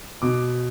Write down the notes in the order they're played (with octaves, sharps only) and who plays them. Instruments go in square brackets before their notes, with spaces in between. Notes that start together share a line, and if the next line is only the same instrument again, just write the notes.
[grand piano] B2 D6